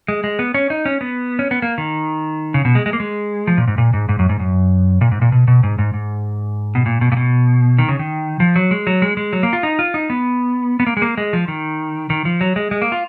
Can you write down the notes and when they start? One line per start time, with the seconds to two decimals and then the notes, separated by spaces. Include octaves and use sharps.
0.08 G#3
0.24 G#3
0.39 B3
0.54 C#4
0.70 D#4
0.85 C#4
1.01 B3
1.39 C#4
1.51 B3
1.62 A#3
1.78 D#3
2.54 C#3
2.65 B2
2.75 G#3
2.86 G#3
2.93 A#3
3.00 G#3
3.47 F3
3.58 A#2
3.68 G#2
3.78 A#2
3.93 G#2
4.09 G#2
4.19 F#2
4.29 G#2
4.40 F#2
5.01 A#2
5.12 G#2
5.22 A#2
5.32 B2
5.48 B2
5.63 G#2
5.78 G#2
5.94 G#2
6.75 B2
6.86 A#2
7.01 B2
7.12 A#2
7.17 B2
7.79 D#3
7.89 C#3
7.99 D#3
8.40 F3
8.56 F#3
8.71 G#3
8.87 F#3
9.02 G#3
9.17 G#3
9.33 F#3
9.43 A#3
9.53 F4
9.63 D#4
9.79 F4
9.94 D#4
10.10 B3
10.80 B3
10.86 A#3
10.97 G#3
11.02 A#3
11.18 G#3
11.33 F3
11.48 D#3
12.10 D#3
12.25 F3
12.41 F#3
12.56 G#3
12.71 G#3
12.82 A#3
12.92 F4